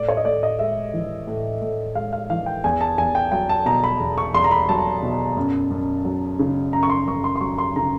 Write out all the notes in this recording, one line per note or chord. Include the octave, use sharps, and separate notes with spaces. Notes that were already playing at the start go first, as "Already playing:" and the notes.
Already playing: A2 D5
C#5
D#5
A2 D5
D#5
G#3 E5
E3
A2
A2
G#3 F5
F5
E3 F5
G5
E2 G#5
A5
E2 G#5
G5
F#3 G5
A5
B2 A#5
B5
E2
C#6
E2 C6
A#5
B5
F#3 A5
B2
F#2
F#2
F#3
C#3
F#2 A#5
C#6
C6
F#2 C#6
C6
C6
F#3 C#6
C6
C#3 A#5